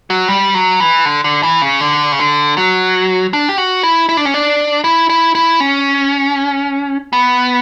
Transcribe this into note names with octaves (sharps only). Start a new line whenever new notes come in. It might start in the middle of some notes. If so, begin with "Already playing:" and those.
F#3
G3
F#3
E3
D3
D3
E3
C#3
D3
C#3
D3
F#3
D4
G4
F#4
E4
E4
D4
C#4
D4
E4
E4
E4
C#4
B3